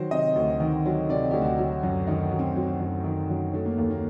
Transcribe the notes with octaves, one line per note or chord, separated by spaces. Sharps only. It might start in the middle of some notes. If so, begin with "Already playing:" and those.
Already playing: D#3 F#3 C5
C3 D#5
D2
D#3
F#3
C3 D5
D2 G4
F#4
F#3
F#2
D#3 D#4
F#2
C4
F#3
F#2
D#3
F#2
F#3 A3
A#3
D#2 A3
A#3